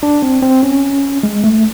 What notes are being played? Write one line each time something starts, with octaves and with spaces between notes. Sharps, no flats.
D4
C4
C4
C#4
G#3
A3